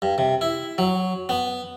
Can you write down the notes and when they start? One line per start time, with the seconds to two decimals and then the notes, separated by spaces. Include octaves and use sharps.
0.02 G2
0.18 C3
0.41 E4
0.78 F#3
1.29 B3